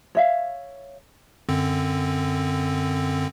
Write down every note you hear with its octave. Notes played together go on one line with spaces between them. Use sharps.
C#5 E5 F5
F#2 D3 C4